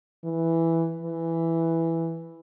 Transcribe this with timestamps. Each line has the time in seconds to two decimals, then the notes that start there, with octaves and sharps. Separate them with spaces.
0.24 E3
1.03 E3